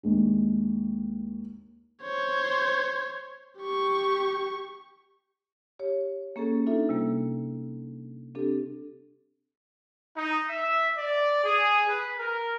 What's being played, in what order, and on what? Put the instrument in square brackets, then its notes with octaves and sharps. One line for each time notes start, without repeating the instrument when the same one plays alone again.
[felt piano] D#2 G#3 D4
[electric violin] C5 C#5
G4 C#6
[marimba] G4 C#5
A#3 C#4 G#4 A4
D4 D#4 F4 A4 E5
C3 G3 A#3
C4 D4 G4 A4
[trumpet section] D#4
E5
D5
G#4
B4
A#4